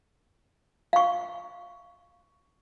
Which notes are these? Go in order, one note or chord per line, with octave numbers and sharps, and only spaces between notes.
F5 C#6